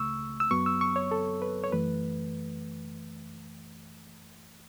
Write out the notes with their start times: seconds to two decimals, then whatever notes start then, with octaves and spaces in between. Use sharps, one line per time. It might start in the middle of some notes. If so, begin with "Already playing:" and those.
Already playing: C#2 C#3 A3 C#6 E6
0.40 E6
0.51 F#2 F#3 B3 C#6
0.66 E6
0.81 C#6
0.96 C#5
1.11 A4
1.42 B4
1.64 C#5
1.72 F#2 E3 A3 B4